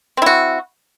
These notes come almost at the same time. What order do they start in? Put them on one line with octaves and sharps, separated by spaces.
C4 E4 F#4